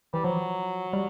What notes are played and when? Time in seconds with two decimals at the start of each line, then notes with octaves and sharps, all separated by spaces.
0.14 E3 G3
0.24 F3 F#3
0.93 G3